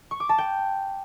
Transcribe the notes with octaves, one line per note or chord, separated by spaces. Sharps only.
C#6
D6
A5
G5